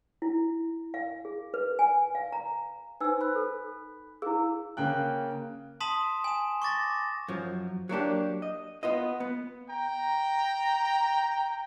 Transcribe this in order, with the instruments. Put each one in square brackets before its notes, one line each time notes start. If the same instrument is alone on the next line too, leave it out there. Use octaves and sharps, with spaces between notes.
[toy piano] E4
F5
G#4
B4
G#5
F5
A#5
[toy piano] D#4 G#5 E6 [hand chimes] B4 C5
[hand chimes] B5 F#6
[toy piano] A4
[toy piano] E4 G#4 [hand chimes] F5 E6
[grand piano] C#3 A#3 G5 F#6
[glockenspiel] A5 C6 D#6 B6 E7 F#7
G#5 E7
C#6 D6 A6 A#6
[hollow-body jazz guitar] F#2 F3
F#3 A#3 D4 G4
D#5
B3 F4 D#5
B3
[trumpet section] G5 A#5